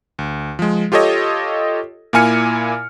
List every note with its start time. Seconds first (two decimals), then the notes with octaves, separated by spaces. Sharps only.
0.19 D2
0.59 F3 G#3
0.92 F4 G4 A4 C#5 D#5
2.13 A#2 A#3 E4 G#5 F6 C#7